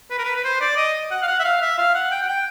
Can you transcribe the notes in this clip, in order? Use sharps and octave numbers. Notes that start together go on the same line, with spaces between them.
B4
A#4
B4
B4
C5
D5
D#5
F#5
F5
F#5
E5
F5
E5
F5
F#5
G5
F#5
G5